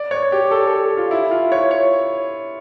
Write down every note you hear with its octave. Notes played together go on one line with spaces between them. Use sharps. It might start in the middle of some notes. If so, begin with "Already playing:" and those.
Already playing: D5
C#5
G4
A4
A4
F4
E4
F4
C#5
C#5